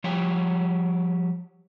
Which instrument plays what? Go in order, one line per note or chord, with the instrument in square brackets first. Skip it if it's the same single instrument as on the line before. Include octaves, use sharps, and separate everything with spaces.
[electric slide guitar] F3 G3 G4 C#5